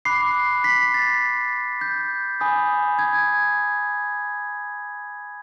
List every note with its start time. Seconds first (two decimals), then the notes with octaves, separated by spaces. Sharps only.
0.05 B5 D6 F#6 C7
0.64 B6
0.94 A6
1.81 G6
2.40 G#5 B5 D#6 G6
2.99 G#6